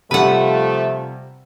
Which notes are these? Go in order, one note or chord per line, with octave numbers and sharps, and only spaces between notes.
C3 F3 G3 A3 B4 F#5